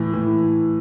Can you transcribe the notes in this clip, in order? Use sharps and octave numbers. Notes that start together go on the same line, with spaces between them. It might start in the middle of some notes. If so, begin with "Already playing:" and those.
Already playing: A2 E3
A2 E3